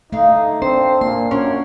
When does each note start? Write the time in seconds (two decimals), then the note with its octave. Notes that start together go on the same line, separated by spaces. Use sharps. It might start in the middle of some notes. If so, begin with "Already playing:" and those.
0.12 D3 A3 D#4 F5
0.62 C4 D4 C5
1.01 A#2 A#3 C6
1.31 F#2 C#4 D4 C#5